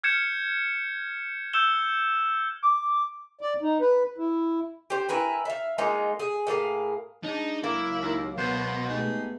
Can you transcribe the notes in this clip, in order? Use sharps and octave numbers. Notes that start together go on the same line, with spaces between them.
F6 G6 G#6 C#7 E7
E6 G6 E7 G7
D6
D5
D#4
B4
E4
G4 C5
E4 A#4 B4 G#5
E5 F5
G#3 A#3 D#4 F4
G#4
A2 A#3 G#4 F5
G#3 D4 D#4
C#2 F#3 A#3 E4
D#2
B2 B3 C5
G#3 A3 B3 D#4 G4 G#4